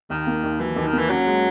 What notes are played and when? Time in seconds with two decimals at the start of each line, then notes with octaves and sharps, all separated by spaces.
0.10 D#2 D#3
0.27 A#3
0.43 D#2
0.60 E3 F#3
0.76 D#2
0.86 D#3
0.93 A#3
0.98 E3
1.10 F#3 C#4
1.26 G#3